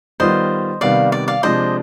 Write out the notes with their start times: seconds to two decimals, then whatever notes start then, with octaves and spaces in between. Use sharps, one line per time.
0.20 D#3 G3 B3 F4 C5 D#5
0.81 C3 D#3 G3 B3 D5 F5
1.12 D5
1.28 D5 F5
1.43 C3 F3 G#3 D4 C5 D#5